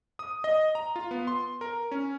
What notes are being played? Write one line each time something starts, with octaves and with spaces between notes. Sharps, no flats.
D#6
D#5
A#5
F4
B3
C6
A#4
C#4